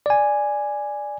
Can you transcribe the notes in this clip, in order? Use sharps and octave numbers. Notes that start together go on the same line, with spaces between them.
D5 G#5